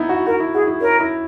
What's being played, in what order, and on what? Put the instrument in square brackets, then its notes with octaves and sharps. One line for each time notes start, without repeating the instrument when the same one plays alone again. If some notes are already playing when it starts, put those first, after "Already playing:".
Already playing: [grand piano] B3 D#4 E4
F#4
[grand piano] F#4 [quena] A#4
[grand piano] E4
[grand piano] F#4 [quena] G#4
[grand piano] E4
[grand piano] C#4 [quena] A#4
[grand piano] E4